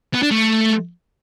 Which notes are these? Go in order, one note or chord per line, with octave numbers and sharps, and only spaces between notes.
B3
D4
A3